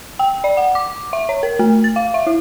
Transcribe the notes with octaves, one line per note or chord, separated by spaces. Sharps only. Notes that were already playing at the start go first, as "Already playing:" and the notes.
G5
D5
F#5
D6
E5
C#5
A#4
A3
A6
F5
E5
E4